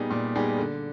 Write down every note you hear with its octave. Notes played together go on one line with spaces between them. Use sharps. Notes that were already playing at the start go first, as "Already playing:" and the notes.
Already playing: A#2 G3 B3 D#4 G#4
A#2
G3 B3 D#4 G#4
D3